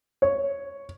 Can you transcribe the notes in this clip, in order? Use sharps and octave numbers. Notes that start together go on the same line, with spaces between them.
C#5